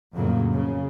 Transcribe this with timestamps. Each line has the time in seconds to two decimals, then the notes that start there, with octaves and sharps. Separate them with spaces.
0.17 F2 A2 C#3 F#3 A#3
0.53 C#3